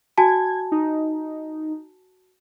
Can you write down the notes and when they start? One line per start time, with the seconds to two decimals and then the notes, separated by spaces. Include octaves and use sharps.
0.18 F#4 G#5 A5 G#6
0.72 D#4